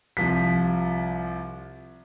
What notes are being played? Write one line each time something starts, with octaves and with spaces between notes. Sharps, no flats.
C2 F3 B6